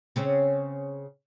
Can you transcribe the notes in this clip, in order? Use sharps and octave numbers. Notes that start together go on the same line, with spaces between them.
C#3 C4 C#4